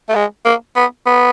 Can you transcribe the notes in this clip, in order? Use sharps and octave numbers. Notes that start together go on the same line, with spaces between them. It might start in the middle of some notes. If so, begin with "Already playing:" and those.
A3
G#3
A#3
B3
B3